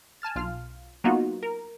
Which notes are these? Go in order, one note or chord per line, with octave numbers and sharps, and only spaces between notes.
G#5 A5 F6 A6
B1 F4 F6
F#3 A#3 B3 D#4 F4 F#4
A#4